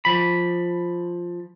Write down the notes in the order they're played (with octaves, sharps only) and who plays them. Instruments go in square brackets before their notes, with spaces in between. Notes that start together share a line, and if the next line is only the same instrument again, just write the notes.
[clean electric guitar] F3 B5